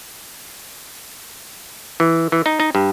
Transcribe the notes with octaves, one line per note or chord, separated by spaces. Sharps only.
E3
E3
D#4
D#4
G2